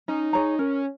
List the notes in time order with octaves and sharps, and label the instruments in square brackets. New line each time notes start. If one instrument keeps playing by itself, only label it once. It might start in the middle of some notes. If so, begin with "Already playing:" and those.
[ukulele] C#4 [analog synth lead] D#4
[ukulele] G#4 C#5 A#5
[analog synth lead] C#4 [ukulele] A#4